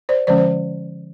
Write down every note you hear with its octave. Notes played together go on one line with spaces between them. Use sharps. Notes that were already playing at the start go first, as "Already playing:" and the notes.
C5 D5
D3 F3 G#3 C#4 C5 D5
C5